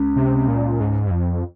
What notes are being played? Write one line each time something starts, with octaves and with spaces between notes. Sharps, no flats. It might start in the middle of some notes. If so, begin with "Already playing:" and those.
Already playing: C#2 C#3
C3
A#2
G#2
G2
F2